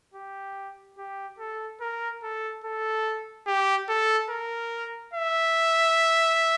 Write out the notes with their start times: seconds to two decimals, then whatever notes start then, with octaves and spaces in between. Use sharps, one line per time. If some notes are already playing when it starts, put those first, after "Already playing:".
0.14 G4
0.98 G4
1.39 A4
1.81 A#4
2.23 A4
2.64 A4
3.47 G4
3.89 A4
4.30 A#4
5.14 E5